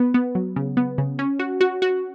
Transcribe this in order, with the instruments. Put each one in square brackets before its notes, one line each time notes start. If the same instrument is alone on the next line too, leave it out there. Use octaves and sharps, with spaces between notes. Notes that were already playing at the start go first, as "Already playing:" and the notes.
Already playing: [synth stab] B3
B3
F#3
C#3
B3
C#3
C#4
F#4
F#4
F#4